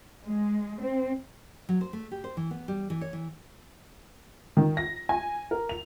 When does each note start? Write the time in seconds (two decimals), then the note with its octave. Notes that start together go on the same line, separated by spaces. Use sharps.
0.24 G#3
0.81 C4
1.69 F#3
1.81 C5
1.93 A3
2.11 G4
2.24 C5
2.37 E3
2.51 B3
2.68 G3
2.90 E3
3.01 C#5
3.13 E3
4.57 D#3
4.77 A#6
5.09 G#5
5.51 A#4
5.69 F7